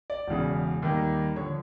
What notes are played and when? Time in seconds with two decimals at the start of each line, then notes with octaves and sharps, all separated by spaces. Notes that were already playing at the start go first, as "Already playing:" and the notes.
0.10 D5
0.27 E1 E2 C#3
0.82 D#2 D#3 G3 A#3
1.35 D3 F3 C#5